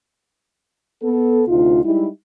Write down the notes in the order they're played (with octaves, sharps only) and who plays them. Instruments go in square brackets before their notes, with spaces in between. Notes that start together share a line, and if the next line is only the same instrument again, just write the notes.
[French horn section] B3 A4
D2 C3 D#4 F4
G3 G#3 D#4 E4